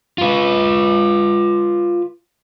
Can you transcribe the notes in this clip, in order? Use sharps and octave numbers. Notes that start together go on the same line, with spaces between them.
F4 B4